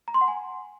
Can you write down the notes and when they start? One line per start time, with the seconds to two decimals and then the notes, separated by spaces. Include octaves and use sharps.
0.08 A#5
0.14 C6
0.21 F#5
0.28 G#5